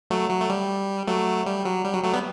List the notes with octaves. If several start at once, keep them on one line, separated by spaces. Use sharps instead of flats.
F#3 A3
F#3
A3
G3
F#3 A3
G3
F#3
G3
F#3
F#3 A3
G3 B3